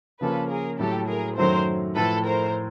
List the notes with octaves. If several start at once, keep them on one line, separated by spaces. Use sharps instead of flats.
C#3 F3 A#3 C#4 F4 A4 B4
G#4 A#4
A2 F#3 A3 G4 A4
G#4 A#4
F#2 D#3 F#3 A3 A#4 C5
A2 F3 A3 A4 B4
A#4 C5